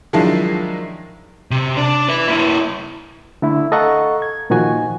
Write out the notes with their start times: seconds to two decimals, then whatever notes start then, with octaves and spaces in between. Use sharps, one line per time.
0.13 D#3 F3 F#3 G#3 D4 E4
1.51 C3
1.77 D4
2.09 B4 E5
2.28 A#3 E4
3.42 D3 A3 E4
3.72 A4 D#5 F5 F#5 A#5 C#6
4.22 G#6
4.50 A#2 D#3 F3 F#4 G#5